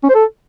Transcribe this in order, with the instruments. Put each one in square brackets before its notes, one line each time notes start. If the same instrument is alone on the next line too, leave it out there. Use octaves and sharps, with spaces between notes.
[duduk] C#4
C5
A4